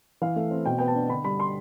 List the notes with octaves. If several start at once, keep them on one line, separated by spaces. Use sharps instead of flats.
E3 F5
A3
C4
B2 G5
B3 G5
A5
D4
D3 B5
G3 B5
C6